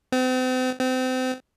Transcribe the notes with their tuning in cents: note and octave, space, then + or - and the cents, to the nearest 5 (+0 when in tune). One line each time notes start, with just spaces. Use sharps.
C4 -40
C4 -30